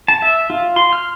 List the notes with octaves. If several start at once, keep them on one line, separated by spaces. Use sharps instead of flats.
A5
E5
F4
C6
F6